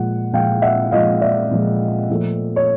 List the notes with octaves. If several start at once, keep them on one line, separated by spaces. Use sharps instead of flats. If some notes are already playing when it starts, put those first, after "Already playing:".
Already playing: A#2 F3 G#3 F#5
A#2 F3 G#3 F5 G5
E5 F#5
A#2 F3 G#3 D#5 F5
D5 E5
A#2 F3 G#3
A#2 F3 A3
C#5